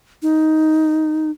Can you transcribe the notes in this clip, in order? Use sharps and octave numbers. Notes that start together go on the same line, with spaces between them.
D#4